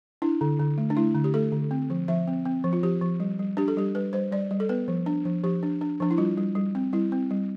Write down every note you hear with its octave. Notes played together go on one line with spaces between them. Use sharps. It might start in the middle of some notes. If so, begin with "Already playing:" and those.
D4 E4
D3
D3
A3
D4
A3 E4
D3
G4
A3 A4
D3
C4
F3
F3 E5
C4
C4
F3
F4
F3 G4
F3
G3
G3
D4 G4
A4
G3 G4
G3 B4
G3 C5
G3 D5
G3
A4
B3 B4
F3
D4
F3
F3 G4
D4
D4
F3 D4
E4
G3 F4
G3
G3
C4
G3 E4
C4
G3